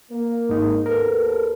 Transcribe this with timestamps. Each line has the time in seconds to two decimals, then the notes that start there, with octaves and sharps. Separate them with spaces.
0.11 A#3
0.49 G#2 D#4
0.86 D#2 B3 A4 A#4